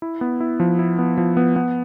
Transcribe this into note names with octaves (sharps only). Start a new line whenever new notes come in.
E4
B3
E4
F3
E4
B3
F3
B3
B3